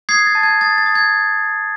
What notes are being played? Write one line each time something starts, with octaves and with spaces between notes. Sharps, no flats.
D#6 G#6 C7
A6
A5
G#6
D#6 A6
A6
D#6
G#6